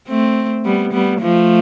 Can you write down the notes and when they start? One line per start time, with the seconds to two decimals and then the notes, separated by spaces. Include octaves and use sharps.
0.08 A3 C4
0.65 G3 B3
0.93 G3 B3
1.21 F3 A3